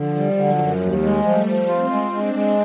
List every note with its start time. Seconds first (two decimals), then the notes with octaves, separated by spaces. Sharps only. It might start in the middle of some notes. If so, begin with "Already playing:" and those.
Already playing: D3 F3
0.16 G3
0.37 D3 F#3
0.59 F#2
0.81 D#2 G3
1.03 G#3
1.24 F3 A3
1.47 F3
1.68 C4 F4
1.90 G#3
2.12 G#3 D4
2.34 G#3